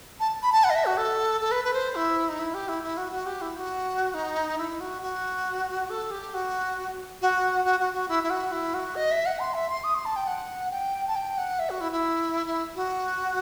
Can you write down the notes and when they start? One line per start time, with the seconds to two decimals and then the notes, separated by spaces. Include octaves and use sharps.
0.20 A5
0.43 B5
0.52 A5
0.64 F#5
0.70 D#5
0.75 E5
0.85 F#4
0.97 A4
1.41 A4
1.52 B4
1.64 B4
1.74 C5
1.95 E4
2.29 D#4
2.39 E4
2.54 G4
2.69 E4
2.83 E4
2.97 F#4
3.12 F#4
3.26 G4
3.41 E4
3.57 F#4
4.14 D#4
4.58 E4
4.80 F#4
5.02 F#4
5.90 A4
6.11 G4
6.34 F#4
7.22 F#4
7.65 F#4
7.80 F#4
7.94 F#4
8.09 E4
8.23 E4
8.30 F#4
8.52 E4
8.74 F#4
8.96 D#5
9.11 E5
9.26 F#5
9.40 C6
9.54 E5
9.70 C6
9.84 D#6
9.95 C6
10.05 A5
10.16 G5
10.27 F#5
10.71 G5
11.08 A5
11.16 G5
11.38 F#5
11.59 E5
11.70 F#4
11.81 E4
11.92 E4
12.47 E4
12.76 F#4